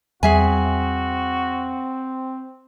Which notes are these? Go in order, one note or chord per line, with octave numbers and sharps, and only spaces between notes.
E2 G3 C4 F#4 G#4 E5 G#5